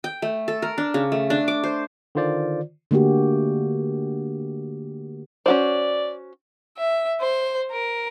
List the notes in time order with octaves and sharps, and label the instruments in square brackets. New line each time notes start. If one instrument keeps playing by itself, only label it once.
[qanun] G5
A3
A4
A#4
D4
C#3
A3
D4
D6
C5
[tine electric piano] D3 D#3 F4 C5 D5
[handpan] D3 A3 A#3 F#4 G4
[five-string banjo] C#4 F#4 C5 [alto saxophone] D5
[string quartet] E5
C5
A#4